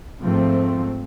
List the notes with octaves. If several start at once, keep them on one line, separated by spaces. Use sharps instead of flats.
G#2 F3 A3 C4